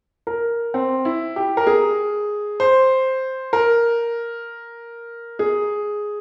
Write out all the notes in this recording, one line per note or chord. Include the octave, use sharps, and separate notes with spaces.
A#4
C4
E4
G4
A#4
G#4
C5
A#4
G#4